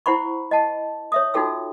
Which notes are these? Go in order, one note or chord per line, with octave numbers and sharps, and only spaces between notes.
E4 C5 F#5 B5 C#6
D#5 F#5 A5
C#5 E5 D#6
D#4 F4 F#4 A4 G5 E6